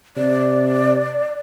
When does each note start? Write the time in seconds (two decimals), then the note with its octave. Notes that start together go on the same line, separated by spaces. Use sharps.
0.17 C3 D5